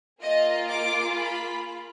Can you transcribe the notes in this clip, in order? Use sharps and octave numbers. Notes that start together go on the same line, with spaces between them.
A#3 F4 G#4 D#5
D6
B5